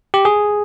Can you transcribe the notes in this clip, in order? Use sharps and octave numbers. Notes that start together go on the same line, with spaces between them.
G4
G#4